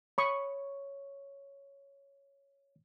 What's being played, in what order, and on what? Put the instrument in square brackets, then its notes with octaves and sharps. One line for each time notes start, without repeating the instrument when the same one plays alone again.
[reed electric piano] C#5 [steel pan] B5 C#6 D#6